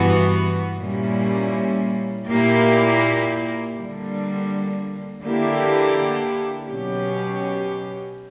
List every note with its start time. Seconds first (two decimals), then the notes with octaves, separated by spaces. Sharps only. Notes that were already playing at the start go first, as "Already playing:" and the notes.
Already playing: G2 E3 B3 F#4
0.80 A#2 G3 A#3 C#4 E4
2.28 A#2 A#3 E4 G4
3.75 D3 G3 A#3
5.22 D3 A#3 E4 G4
6.68 B2 F#3 C#4 G4